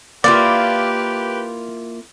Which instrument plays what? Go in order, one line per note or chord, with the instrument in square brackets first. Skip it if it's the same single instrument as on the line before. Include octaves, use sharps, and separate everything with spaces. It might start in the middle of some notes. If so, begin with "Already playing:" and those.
[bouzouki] A#3 E4 F4 [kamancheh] G4 B4 [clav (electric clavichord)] D5